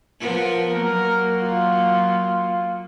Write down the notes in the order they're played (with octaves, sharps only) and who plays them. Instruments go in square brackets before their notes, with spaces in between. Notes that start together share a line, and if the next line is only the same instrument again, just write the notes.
[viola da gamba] F3 B3 A#4
[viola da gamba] F#3 A#3 [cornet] A#4
[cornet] F4